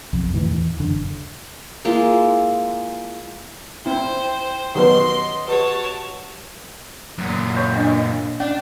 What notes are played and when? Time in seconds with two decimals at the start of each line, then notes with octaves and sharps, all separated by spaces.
0.13 B1 F2
0.33 A2 D#3 E3
0.50 E2
0.80 F#1 D3
1.85 G#3 A#3 E4 F4
3.86 C4 E4 C5 G5
4.75 D#3 F#3 B3 G4 B4 D#5 C6
5.48 F#4 G4 B4 C#5 A5
7.18 F#2 A#2
7.56 C#5 C#6
7.76 D4 D#5
8.40 C#4 D4